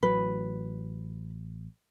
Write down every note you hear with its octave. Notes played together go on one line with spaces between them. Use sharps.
A1 F#3 B4